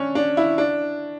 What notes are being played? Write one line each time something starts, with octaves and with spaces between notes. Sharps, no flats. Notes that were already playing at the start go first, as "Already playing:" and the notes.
Already playing: C#4 D4
D4
E4
D4